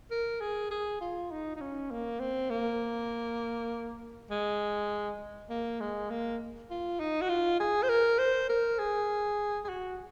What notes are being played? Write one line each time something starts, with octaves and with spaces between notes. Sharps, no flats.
A#4
G#4
G#4
F4
D#4
D#4
C#4
A#3
C4
A#3
G#3
A#3
G#3
A#3
F4
D#4
F#4
F4
G#4
C5
A#4
C5
A#4
G#4
G#4
F#4